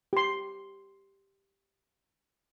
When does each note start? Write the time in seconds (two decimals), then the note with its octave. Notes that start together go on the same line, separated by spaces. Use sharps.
0.13 G4 C6